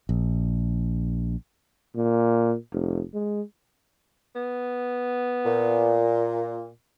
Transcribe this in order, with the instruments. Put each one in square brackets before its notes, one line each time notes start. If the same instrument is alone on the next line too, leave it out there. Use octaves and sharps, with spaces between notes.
[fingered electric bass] A#1
[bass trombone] A#2
F1
G#3
[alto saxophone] B3
[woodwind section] A#2